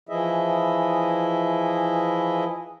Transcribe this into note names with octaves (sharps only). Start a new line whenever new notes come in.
E3 F3 E4 G#4 D#5 E5